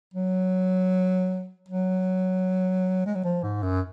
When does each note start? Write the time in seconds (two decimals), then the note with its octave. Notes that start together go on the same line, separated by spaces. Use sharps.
0.14 F#3
1.69 F#3
3.06 G#3
3.15 F#3
3.24 F3
3.43 G#2
3.63 F#2